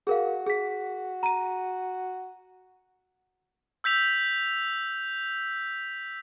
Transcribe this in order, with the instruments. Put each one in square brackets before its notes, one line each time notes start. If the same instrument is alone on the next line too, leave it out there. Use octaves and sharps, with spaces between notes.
[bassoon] F#4 [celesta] G#4 A#4 F5
[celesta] G#4 B6
A#5 D#7
[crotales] E6 G6 B6 F7